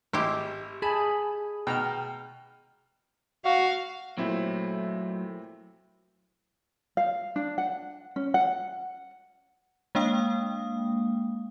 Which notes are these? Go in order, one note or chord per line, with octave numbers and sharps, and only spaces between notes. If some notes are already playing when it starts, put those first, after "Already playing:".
G#1 E4 G4 C6
G#4 G#5 A5 B5
B2 G5 A#5 F6
F#4 F5
A#2 F#3 A3 C4 E4
F5
D4
F#5
C#4
F#5
G#3 A#3 D4 F5 G5 D#6